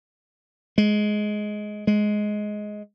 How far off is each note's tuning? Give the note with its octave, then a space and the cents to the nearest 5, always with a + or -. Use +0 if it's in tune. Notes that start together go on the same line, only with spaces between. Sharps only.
G#3 +15
G#3 +10